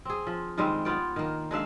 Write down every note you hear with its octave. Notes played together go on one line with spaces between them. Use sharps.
C4 G#4
F3
D#3 G3 G#3 C4
B3 F4 D5 G5
D#3 A#3
G#3 D4 E5 F5